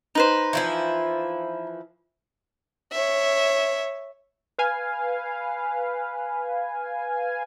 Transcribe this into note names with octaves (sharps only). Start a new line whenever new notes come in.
D#4 B4 C5
E3 F3 E4
C#5 E5
B4 F5 G#5